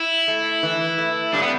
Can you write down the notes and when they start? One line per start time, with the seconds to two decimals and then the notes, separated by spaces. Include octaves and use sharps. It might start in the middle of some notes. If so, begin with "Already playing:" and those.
Already playing: E4
0.28 A3
0.63 E3
0.98 A3
1.34 G3 D4
1.42 B3